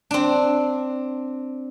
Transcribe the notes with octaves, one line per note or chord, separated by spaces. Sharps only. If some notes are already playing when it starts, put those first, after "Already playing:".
C4 D4